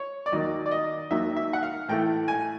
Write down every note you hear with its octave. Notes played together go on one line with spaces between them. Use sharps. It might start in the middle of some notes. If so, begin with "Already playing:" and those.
Already playing: C#5
D5
D#2 D#3 F#3 A#3 D#5
D5
D#5
D#2 D#3 F#3 A#3 E5
E5
F#5
F5
A2 E3 A3 G5
G#5